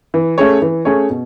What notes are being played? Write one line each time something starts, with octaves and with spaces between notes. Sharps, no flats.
E3
A3 C#4 G#4 C#5
E3
A3 C#4 G#4 C#5
B2